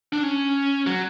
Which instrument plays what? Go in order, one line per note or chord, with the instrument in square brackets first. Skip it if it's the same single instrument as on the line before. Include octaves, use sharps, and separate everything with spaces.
[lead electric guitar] D4
C#4
F#3